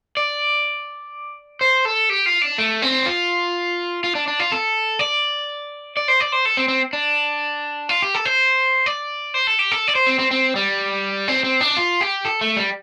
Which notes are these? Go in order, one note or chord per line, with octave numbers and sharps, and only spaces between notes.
D5
C5
A4
G4
F4
D4
A3
C4
F4
F4
D4
D4
F4
A4
D5
D5
C5
D5
C5
A4
C4
C4
D4
F4
G4
A4
C5
D5
C5
A4
G4
A4
D5
C5
C4
C4
C4
G3
C4
C4
D4
F4
G4
A4
A3
G3